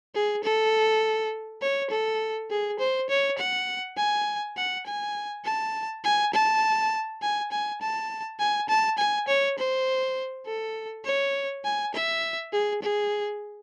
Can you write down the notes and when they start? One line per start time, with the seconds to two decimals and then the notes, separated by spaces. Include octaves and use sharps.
0.15 G#4
0.44 A4
1.62 C#5
1.91 A4
2.50 G#4
2.79 C5
3.10 C#5
3.38 F#5
3.97 G#5
4.57 F#5
4.86 G#5
5.44 A5
6.04 G#5
6.34 A5
7.21 G#5
7.52 G#5
7.81 A5
8.39 G#5
8.69 A5
8.98 G#5
9.28 C#5
9.58 C5
10.46 A4
11.05 C#5
11.64 G#5
11.94 E5
12.53 G#4
12.82 G#4